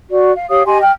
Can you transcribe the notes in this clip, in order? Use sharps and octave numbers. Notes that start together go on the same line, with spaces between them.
F#4 D5
F5
G4 C#5 F5 D#6
G4 D#5 G#5 C6
G5 F6